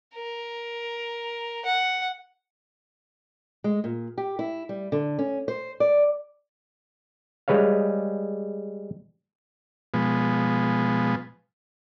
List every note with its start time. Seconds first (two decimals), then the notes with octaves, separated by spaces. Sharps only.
0.14 A#4
1.65 F#5
3.64 G#3
3.84 A#2
4.18 G4
4.39 E4
4.69 G3
4.92 D3
5.19 C#4
5.48 C5
5.80 D5
7.48 G3 G#3 B4 C#5 F5
9.94 B2 F3 G#3 B3